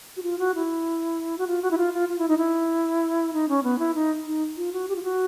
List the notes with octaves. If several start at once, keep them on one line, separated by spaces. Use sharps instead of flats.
F#4
F4
F#4
E4
F#4
F4
F#4
E4
F4
F4
F4
E4
D#4
E4
D#4
C#4
B3
E4
D#4
D#4
F4
F#4
G4
F4
F#4